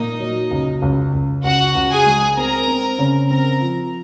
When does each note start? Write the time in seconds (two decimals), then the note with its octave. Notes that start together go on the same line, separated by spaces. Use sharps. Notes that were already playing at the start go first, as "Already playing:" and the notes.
Already playing: A#2 A#3 D#4 D#5
0.20 F#3
0.51 C#2
0.82 C#2
1.13 C#2
1.43 C#2 F#4 F#5
1.75 C#2
1.90 G#4 G#5
2.06 G#3
2.37 C4 A#4 A#5
2.68 C4
2.99 C#3
3.29 C4 A#4 A#5
3.61 F3